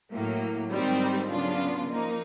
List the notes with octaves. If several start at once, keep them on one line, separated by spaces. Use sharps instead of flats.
A2 F#3 A#3
G#2 D#3 G3 C4
C#3 F#3 B3 D4 F4
F3 A#3 D#4